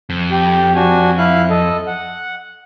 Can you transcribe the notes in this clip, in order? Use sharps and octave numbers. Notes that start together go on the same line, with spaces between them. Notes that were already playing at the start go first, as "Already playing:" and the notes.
F2
G4
D4 F#4 G#5
E4 F5 F#6
A4 D#5
F#5